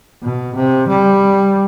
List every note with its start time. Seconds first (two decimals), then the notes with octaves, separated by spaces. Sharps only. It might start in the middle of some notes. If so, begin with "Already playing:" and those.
0.23 B2
0.55 C3
0.88 G3